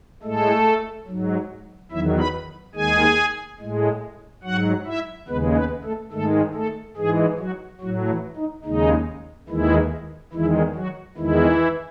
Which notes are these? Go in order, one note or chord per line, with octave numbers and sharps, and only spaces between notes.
A2 G#3 A3 A4
G#2 F#3
E2 D#3 F#3 E4 E5
B4 B5
D#2 D#3 G#3 G#4 G#5
A2 G#3
G#2 F#3 F#4 F#5
E4 E5
D#2 C#3 G#3 B3 B4
B3 B4
A3 A4
G#2 D#3 G#3 A3 A4
A3 A4
G#2 E3 G#3 G#4
F#3 F#4
A2 F#3 F#4
E3 E4
D#4
D#2 C#3 G#3 D#4
D#2 D#3 E3 G#3 E4
E2 D#3 E3 G#3 E4
F#3 F#4
E2 D#3 E3 G#3 E4